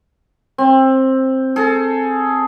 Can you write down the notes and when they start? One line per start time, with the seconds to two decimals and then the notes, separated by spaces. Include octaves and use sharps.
0.58 C4
1.56 G#4 A4